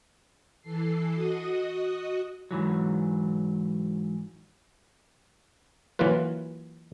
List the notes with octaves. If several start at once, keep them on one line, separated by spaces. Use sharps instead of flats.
E3 A4 C7
F#4 D#5 D#6
G#2 E3 F#3
E3 F#3 A#3 F4 B4